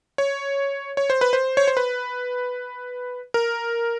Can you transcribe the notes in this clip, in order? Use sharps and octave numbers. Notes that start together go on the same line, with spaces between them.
C#5
C#5
C5
B4
C5
C#5
C5
B4
A#4